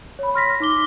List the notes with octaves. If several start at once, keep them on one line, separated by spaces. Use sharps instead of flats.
C#5 B5
C6 F6 A#6 B6
D#4 D6 G7